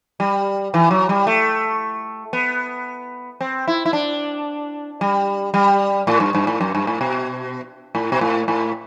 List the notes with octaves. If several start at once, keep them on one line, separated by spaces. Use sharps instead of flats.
G3
E3
F#3
G3
A3
B3
C4
E4
E4
D4
G3
G3
A2
G2
G2
A2
F#2
G2
A2
B2
A2
B2
A2
A2